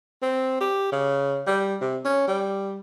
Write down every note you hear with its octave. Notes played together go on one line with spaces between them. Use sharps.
C4
G4
C#3
G3
C3
C#4
G3